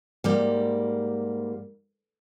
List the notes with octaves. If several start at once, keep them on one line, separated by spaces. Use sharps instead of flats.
G#2 G3 A#3